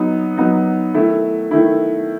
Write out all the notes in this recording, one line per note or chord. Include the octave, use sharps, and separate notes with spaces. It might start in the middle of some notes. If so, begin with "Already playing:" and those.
Already playing: F#3 B3 D#4
F#3 B3 D#4
D#3 A3 E4
D#3 A3 E4